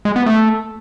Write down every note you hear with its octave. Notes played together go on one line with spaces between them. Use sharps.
G#3
B3
A3